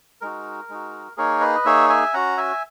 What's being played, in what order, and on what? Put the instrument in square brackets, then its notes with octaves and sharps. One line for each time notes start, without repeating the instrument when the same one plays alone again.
[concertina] G#3 D#4 F#4 A#4
G#3 D#4 F#4
A#3 D#4 G#4 A#4 C#5
B4 D#5
A#3 D#4 G#4 C#5 E5
E5 G#5
C#4 F#4 F#5 A#5
E5 G#5